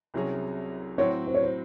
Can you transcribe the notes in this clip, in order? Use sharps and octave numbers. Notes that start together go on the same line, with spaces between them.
C2 C3 F#3 C#4 G#4
A2 F#3 C4 F#4 C#5
C5
C#5
C5